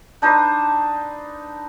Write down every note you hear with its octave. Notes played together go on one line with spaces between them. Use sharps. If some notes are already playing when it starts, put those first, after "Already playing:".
D4 D#4 B4 C5